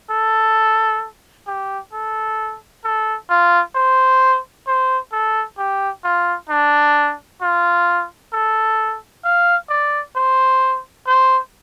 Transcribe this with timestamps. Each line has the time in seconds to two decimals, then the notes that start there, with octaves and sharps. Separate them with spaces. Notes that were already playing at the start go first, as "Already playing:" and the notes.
0.10 A4
1.47 G4
1.93 A4
2.84 A4
3.30 F4
3.75 C5
4.67 C5
5.12 A4
5.58 G4
6.04 F4
6.49 D4
7.42 F4
8.33 A4
9.24 F5
9.69 D5
10.15 C5
11.07 C5